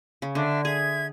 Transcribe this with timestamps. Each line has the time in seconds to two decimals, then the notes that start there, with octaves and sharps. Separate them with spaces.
0.22 C#3
0.35 D3 D4 E5
0.65 G#4 E5 G#6